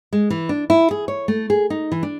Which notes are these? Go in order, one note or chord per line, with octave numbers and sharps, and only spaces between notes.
G#3
E3
D4
E4
G#4
C#5
A3
G#4
D#4
E3
D4